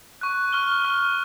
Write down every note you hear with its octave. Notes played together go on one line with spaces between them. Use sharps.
C#6 F#6
C#6 F6 G7
C#6 F6